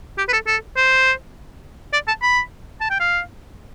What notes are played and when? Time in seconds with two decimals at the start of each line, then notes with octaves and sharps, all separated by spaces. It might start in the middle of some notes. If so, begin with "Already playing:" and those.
0.18 G4
0.29 B4
0.33 A4
0.47 A4
0.77 C5
1.93 D5
2.08 A5
2.22 B5
2.81 A5
2.90 G5
3.00 F5